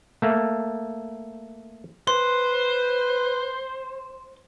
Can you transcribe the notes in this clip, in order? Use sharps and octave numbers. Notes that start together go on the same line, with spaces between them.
A3 A#3
B4 C5 C6